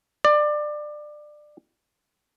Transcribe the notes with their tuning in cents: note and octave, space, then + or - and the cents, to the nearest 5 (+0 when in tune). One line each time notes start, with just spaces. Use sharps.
D5 +20